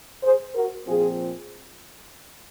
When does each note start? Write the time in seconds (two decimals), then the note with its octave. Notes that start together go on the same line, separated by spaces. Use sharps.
0.23 G#4 C5
0.55 F#4 A#4
0.87 A#2 F3 C4 F4 G#4